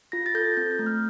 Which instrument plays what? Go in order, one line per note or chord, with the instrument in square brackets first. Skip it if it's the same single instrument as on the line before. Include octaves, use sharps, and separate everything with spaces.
[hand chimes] F4 A#6
A6
A4 G6
C4 G6
G6
A3
F6